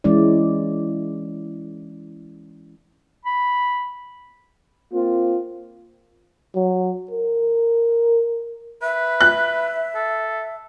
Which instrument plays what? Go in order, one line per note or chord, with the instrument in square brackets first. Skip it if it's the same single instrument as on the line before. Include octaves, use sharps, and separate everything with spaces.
[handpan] E3 G#3 C#4 E4 D5
[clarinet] B5
[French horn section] A#3 C4 F4
[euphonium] F#3
A#4
[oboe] B4 [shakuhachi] E5
[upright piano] F#6
[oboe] A4